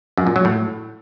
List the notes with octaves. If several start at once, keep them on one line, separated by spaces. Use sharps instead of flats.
F#2
A#2
F#3
A2